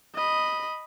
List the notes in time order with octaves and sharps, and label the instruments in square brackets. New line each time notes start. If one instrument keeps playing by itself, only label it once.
[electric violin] D#5 B5